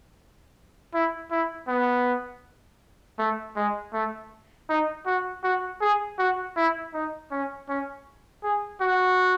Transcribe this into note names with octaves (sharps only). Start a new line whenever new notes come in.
E4
E4
B3
A3
G#3
A3
D#4
F#4
F#4
G#4
F#4
E4
D#4
C#4
C#4
G#4
F#4